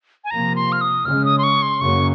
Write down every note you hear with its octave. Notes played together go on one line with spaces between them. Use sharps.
G#5
C3 F3 A#3 A#5
C6
F6
D#6
C#3 G#3 C#4 F6
D#6
C6
C#6
C6
F#2 C#3 F#3 A#3 C#6